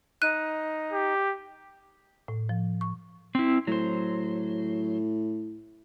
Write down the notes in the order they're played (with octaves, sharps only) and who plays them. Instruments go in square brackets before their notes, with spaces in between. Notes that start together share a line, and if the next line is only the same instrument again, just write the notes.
[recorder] D#4 [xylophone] F#6 D#7
[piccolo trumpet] G4
[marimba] A2
F3
C#6
[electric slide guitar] C4 E4
[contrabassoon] A2 [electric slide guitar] F#3 C5